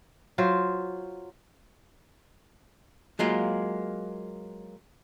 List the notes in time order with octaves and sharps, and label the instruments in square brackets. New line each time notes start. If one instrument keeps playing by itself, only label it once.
[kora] F#3 F4 C5
[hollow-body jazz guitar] F#3 G#3 A#3 F4